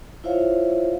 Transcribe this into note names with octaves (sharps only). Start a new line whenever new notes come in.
E4 F4 C5 C#5 E5 F5